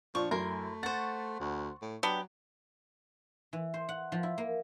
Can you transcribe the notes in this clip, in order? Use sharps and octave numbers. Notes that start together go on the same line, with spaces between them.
A#2 F3 D4 C#6
F#2 A3 E4 A#4 C6
C5 F#5 C#6 A6
D2
A2
F#3 B3 D4 G4
E3
C5
F#5
F3
E4
A#3